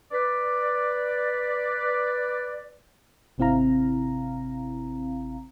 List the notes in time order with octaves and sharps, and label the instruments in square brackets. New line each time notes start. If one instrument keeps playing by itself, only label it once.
[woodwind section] B4 D5
[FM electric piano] G#1 C3 C4 E4 F5 A#5